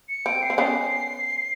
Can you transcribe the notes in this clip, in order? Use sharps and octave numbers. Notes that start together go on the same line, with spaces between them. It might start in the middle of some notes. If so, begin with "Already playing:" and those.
C#7
C4 D7
C7
C4
B3 C#4 C7